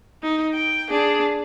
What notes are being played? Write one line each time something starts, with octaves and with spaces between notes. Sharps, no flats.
D#4
G5
D4 G#4